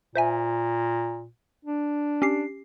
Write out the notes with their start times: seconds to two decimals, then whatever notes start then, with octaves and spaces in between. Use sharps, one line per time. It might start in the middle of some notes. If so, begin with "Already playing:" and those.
0.16 A#2 C5 E5 G#5
1.65 D4
2.22 C#4 G4 C7